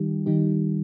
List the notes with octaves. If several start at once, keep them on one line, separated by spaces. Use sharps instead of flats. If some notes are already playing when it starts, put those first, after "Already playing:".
Already playing: D#3 G3 D#4 G4
D#3 G3 D#4 G4